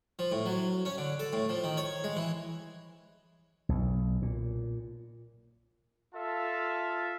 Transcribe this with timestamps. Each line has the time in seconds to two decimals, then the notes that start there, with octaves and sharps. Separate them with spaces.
0.19 F3
0.32 A2
0.46 F#3
0.85 C#4
0.98 D3
1.19 A4
1.33 A2
1.49 F3
1.64 D#3
1.77 C#5
2.04 G#3
2.16 E3
3.69 B1
4.22 A#2
6.14 F4 A4 E5 F5 A5